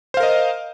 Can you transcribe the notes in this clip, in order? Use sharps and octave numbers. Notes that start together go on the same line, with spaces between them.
A#4 C5 D#5 F5